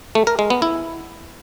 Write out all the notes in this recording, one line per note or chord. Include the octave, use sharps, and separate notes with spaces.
A3
A#4
G#3
B3
E4